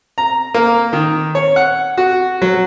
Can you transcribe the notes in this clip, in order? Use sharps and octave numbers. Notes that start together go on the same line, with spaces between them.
A#5
A#3
D#3
C#5
F#5
F#4
F#3